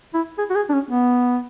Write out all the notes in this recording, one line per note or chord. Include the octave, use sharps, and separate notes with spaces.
E4
G#4
F#4
G#4
D4
C#4
B3